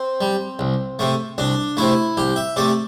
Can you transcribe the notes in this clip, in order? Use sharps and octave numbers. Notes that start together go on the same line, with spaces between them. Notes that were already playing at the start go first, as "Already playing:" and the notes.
Already playing: C4
G3
C2
C3 A3
C2 D4
C3 A3 E4
C2 G4
E5
C3 A3 D5